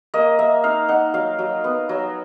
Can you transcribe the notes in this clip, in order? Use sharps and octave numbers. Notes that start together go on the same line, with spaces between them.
A#3 D#5
A#3 E5
D#4 F5
D#4 F#5
F#3 F5
F#3
B3
F#3